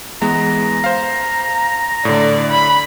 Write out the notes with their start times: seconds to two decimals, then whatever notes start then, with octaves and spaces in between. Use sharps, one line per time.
0.21 E3 G#3 B3 A#5
0.84 C5 F5
2.05 A2 D3 D5
2.51 B5